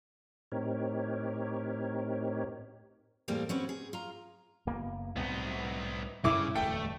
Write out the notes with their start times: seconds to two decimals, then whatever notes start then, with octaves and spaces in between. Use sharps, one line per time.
0.52 A2 C4 D#4 G4 A#4 C#5
3.28 E2 A2 G3 A#3 C4 G#4
3.49 C4 C#4 F#4 B4
3.69 G#4
3.93 F4 A#5
4.67 F#1 A#3 B3
5.16 C2 A2 C3 B3 D#4
6.24 G2 C#3 G3 G#3 E4 D6
6.55 D1 E2 A3 G5